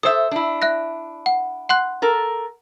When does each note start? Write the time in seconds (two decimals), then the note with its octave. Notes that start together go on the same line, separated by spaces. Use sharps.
0.03 A4 C5 E5 D#6 E6
0.31 D4 E4
0.62 E5 F#6 A#6
1.26 F#5
1.69 F#5 C6 F#6
2.02 A4 A#4